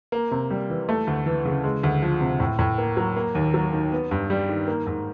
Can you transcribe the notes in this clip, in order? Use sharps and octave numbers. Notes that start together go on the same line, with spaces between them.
A#3
C3
G3
E3
A3
D2
E3
C#3
G#3
D2
F3
C3
A2
A2
A#3
F#3
A#3
D#2
F#3
D#3
B3
G2
G3
D#3
A#3
G#2